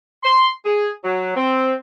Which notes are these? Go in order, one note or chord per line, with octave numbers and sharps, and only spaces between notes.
C6
G#4
F#3
C4